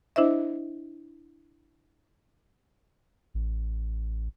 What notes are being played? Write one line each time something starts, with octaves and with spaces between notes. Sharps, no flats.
D4 E4 C5 D#5 E5
A1